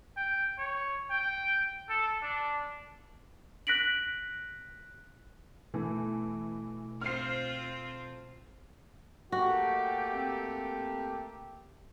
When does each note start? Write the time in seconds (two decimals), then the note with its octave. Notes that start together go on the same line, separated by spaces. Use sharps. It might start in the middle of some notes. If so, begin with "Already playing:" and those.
0.17 G5
0.59 C#5
1.10 G5
1.90 A4
2.23 D4
3.67 F#6 A#6 B6 D7 F#7
5.74 B2 E3 A3
7.01 C4 F4 C5 F6 C7
9.32 A3 A#3 F#4 G4
10.14 C4